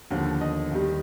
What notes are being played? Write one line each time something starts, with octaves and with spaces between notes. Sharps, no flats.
D#2 D3 F3
D#5
D#2 D#3 G3